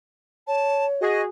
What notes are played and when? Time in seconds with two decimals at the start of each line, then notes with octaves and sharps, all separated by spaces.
0.47 C#5 A5
1.01 F#4 G#4 D#5